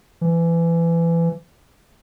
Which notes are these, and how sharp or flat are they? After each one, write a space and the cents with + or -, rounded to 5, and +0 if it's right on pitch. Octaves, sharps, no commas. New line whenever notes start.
E3 +25